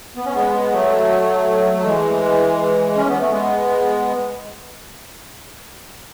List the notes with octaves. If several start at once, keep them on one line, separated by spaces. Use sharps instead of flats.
B3
C#4
G#3 B3
F#3 A3
F#3
E3 G#3
C#4
B3
A3
G#3 B3